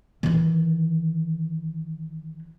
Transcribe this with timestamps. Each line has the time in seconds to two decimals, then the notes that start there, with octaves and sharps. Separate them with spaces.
0.23 D#3 E3